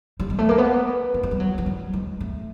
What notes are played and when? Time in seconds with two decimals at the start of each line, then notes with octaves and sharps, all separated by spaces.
0.20 G3
0.30 G#3
0.39 A3
0.49 A#3
0.58 B3
1.14 A3
1.23 G#3
1.31 G3
1.40 F#3
1.58 F#3
1.66 G3
1.93 G#3
2.21 A3